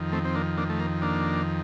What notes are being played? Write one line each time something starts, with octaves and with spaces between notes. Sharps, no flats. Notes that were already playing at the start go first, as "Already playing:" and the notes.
Already playing: F2 D#3
A3 C4
C4
A#3 D4
A#3 D4
A3
A#3
A#3 D4